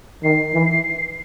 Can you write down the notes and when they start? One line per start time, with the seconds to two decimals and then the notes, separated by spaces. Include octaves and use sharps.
0.23 D#3 C7
0.54 E3